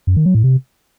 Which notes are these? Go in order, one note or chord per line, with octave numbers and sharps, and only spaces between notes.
F#2
D#3
F#3
A2
C3